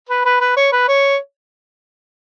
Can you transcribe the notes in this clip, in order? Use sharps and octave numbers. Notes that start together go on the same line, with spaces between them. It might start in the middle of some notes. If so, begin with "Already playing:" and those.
B4
B4
B4
C#5
B4
C#5